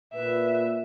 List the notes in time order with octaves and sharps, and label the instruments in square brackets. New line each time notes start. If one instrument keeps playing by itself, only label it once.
[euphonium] A#2 [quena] B4 [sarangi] E5